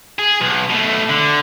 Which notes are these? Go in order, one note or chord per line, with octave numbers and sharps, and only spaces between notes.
G#4
B1
B2 A3
D3